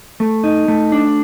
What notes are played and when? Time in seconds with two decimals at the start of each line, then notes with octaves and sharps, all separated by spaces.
0.20 A3
0.44 D#4
0.68 A3
0.92 D4